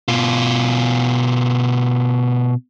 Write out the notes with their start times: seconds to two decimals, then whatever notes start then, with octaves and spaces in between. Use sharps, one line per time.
0.08 B2 F4